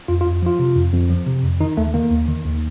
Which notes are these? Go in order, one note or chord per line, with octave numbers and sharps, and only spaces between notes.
F2 F4
F4
F2
F3 F4
C3
F2
F2
F3
C3
F2
D#3 D#4
D#2 A3
D#3 A#3
D#2
D#3
D#2